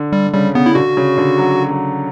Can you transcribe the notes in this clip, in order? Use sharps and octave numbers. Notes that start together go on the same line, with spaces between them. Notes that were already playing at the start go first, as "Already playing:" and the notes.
Already playing: D3
G3
C#3 G3
C#3 B3
E4
D3 F#4
C#3
D3
F#3
F#3